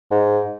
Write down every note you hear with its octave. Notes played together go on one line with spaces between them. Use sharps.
G#2